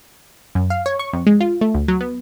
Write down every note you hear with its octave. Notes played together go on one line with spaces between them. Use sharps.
F#2
F5
C#5
C#6
F2
G#3
F4
A3
D2
F#3
B3